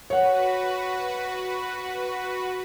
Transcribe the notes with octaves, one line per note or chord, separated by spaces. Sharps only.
F#4 B4 C#5 F#5